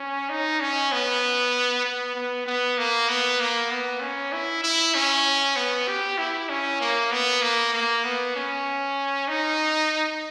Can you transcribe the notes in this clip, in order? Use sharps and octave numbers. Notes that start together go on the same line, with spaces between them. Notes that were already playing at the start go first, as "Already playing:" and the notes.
Already playing: C#4
D#4
C#4
B3
B3
B3
B3
A#3
B3
A#3
B3
C#4
E4
E4
C#4
B3
G4
E4
C#4
A#3
B3
A#3
A#3
B3
C#4
D#4